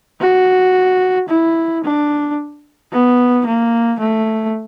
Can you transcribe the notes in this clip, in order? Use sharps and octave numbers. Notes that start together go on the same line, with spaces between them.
F#4
E4
D4
B3
A#3
A3